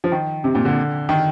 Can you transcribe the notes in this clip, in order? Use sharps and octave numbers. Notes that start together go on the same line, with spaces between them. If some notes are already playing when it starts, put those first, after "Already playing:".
F3
D#3
C3
A#2
D3
D#3